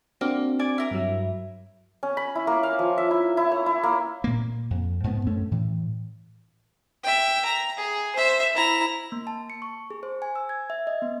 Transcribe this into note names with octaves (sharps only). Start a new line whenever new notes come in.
A#3 C4 D4 F#4
D5 G#5 D6
E4 A#4
G2 F#3
C#4
B5
E4
A#3
F5
F3
E5
E4
E4
C#5
E4
A#3
A#2 A#3
F2
G#2 B3
F#2 A3 C#4
A2 E3
E5 G5
A#5
G#4
C5 E5
E4 A#5
A#3
A5
C#7
C#6
G#4
C5
G#5
E6
G#6
E5
D#5
B3